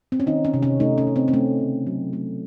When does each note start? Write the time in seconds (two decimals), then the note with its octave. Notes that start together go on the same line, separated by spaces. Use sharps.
0.12 C4
0.20 C#4
0.26 D#3 D#4
0.45 C#4
0.54 C3
0.63 C#4
0.80 A3 D#4
0.98 C#4
1.07 C3
1.16 C4
1.28 C4
1.33 A3 C#4
1.60 C#3
1.87 F#3
2.13 A3